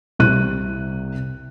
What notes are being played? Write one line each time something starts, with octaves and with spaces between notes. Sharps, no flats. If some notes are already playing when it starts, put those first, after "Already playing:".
C2 C3 F#6 D#7